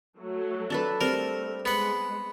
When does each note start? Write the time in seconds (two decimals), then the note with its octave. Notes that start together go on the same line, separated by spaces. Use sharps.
0.19 F#3 A3
0.70 D4 A4 B4
1.01 G3 A3 C4 A#4
1.65 G#3 B3 F#5